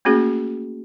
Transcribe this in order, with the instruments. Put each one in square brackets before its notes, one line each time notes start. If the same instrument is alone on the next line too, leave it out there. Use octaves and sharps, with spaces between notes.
[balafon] A3 A#3 C#4 F#4 G#4